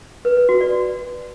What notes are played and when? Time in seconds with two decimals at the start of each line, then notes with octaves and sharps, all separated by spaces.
0.25 B4
0.37 B4
0.49 F#4
0.61 D5